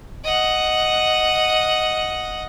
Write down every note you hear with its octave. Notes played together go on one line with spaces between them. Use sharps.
D#5 F#5